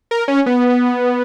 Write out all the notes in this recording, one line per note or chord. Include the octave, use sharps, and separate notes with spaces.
A#4
C#4
B3